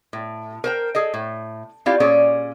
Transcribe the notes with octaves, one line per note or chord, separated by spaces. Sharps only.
A2
A#4 C5 G5
G#4 A4 D#5
A2
C4 E4 F4 G4 D5 F5
A#2 C#4 G#4 D5